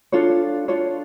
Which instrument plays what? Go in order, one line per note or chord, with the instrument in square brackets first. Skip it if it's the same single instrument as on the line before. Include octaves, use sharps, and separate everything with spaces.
[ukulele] D4 F4 A4 C#5
D4 F4 A4 C#5